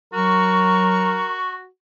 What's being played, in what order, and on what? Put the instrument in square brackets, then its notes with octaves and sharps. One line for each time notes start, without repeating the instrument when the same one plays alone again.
[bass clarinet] F#3 [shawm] F#4 [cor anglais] A#4 [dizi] C#6